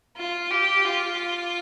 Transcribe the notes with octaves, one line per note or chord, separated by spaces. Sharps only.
F4
G4
F4